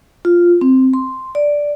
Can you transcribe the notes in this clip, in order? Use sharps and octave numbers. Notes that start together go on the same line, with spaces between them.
F4
C4
C6
D5